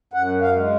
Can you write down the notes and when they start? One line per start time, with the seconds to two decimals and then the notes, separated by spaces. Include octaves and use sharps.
0.13 F#2 F#5
0.42 F5
0.55 G#3